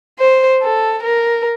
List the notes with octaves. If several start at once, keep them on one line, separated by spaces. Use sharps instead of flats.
C5
A4
A#4